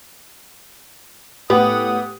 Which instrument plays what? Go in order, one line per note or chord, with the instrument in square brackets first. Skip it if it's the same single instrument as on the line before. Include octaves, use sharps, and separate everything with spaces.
[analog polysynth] A2 F#5 [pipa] B3 [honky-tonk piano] G4 [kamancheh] D#6